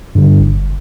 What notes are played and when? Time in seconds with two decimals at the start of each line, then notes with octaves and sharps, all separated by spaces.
0.15 G2 D3
0.40 G1